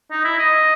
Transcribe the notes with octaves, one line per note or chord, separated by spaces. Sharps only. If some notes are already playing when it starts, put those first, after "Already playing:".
D#4
E4
D#5